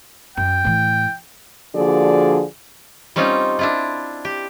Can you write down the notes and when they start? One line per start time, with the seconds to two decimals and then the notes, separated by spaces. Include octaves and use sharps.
0.37 F#2 G5
0.64 A2 E3
1.75 D3 F3 A#3 F#4 G#4 D5
3.16 G3 C4 C#4 D#4 F4
3.59 D4 E4 F4
4.25 G4